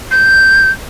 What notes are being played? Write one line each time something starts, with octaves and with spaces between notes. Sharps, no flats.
G6